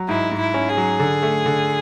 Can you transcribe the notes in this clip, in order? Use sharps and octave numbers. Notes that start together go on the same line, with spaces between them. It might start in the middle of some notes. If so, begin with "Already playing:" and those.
Already playing: F#3
G#2 E4
G#2
E4
C#4
G#4
F#3
D3
A3
D3